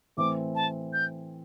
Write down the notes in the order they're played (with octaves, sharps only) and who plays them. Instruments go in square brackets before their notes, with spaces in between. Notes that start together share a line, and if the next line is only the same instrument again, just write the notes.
[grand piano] A2 E3 C4 [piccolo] D6
[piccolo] A5
G6